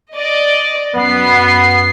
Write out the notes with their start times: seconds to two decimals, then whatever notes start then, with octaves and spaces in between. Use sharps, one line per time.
0.13 D5 D#5
0.95 F#2 B3 C7